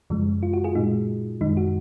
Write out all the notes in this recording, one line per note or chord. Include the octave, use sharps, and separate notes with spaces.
F#2 C#3 F3 G#3
F4
F#4
F4 G#4
A#2 G#3 D#4
F#2 D#3 G#3 D#4
F#4